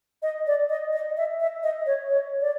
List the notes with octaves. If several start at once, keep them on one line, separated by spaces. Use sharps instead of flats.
D#5
D5
D#5
D#5
E5
E5
D#5
C#5
C#5
D5